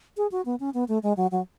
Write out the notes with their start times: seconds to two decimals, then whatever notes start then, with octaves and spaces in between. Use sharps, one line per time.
0.17 G#4
0.32 F#4
0.45 B3
0.60 C#4
0.74 B3
0.88 A3
1.03 G#3
1.17 F#3
1.31 F#3